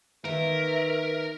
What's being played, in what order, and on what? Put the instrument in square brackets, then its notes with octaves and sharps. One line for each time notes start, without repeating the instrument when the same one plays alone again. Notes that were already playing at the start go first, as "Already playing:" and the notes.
[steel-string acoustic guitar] D#3 A#3 [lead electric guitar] A#4 [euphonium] B4 [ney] E5